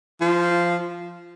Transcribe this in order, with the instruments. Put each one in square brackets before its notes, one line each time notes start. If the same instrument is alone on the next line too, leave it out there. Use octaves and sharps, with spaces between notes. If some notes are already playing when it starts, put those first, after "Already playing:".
[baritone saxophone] F3